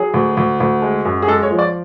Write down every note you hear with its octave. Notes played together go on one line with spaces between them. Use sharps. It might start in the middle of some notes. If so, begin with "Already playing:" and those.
Already playing: F#3 G#4
D2
D2
D2
G#3
F#2
G#4
G#3 A4
C#5
F3
D5